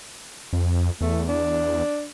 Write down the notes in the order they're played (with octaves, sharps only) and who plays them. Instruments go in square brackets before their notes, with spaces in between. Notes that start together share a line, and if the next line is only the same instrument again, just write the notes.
[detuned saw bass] F2
[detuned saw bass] E2 [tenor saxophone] A3
[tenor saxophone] D4